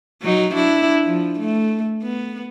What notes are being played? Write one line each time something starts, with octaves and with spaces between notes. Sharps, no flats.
F#3 D#4
D4 E4
F3
A3
B3